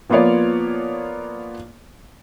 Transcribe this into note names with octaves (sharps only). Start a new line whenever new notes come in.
F3 A#3 B3 F4 C#5 D5